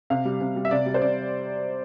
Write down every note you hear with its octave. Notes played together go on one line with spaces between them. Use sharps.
C3 F5
G3
C3
G3
E5
C3 D5
G3
C5
C3 D5